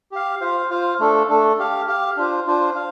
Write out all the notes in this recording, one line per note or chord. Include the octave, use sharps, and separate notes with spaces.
G4 F5
F4 C5 F5
F4 C5 F5
A3 D4 A4
A3 D4 A4
G4 F5
G4 F5
D4 F4 C5
D4 F4 C5
F5